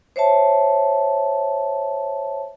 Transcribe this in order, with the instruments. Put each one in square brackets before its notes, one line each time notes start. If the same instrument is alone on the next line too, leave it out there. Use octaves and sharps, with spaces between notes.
[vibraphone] C5 C#5 E5 A5